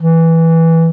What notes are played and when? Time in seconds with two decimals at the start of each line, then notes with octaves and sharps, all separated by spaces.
0.02 E3